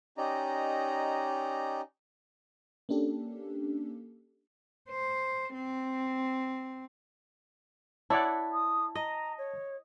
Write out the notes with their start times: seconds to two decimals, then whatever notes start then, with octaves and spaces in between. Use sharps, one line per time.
0.18 C#4 D#4 G4 D5 D#5 A#5
2.89 A#3 C#4 D4 G4 A4
4.90 C5
5.53 C4
8.10 E4 C#5 D5 F#5 A5
8.52 D#6
8.95 D#5 A#5
9.38 C#5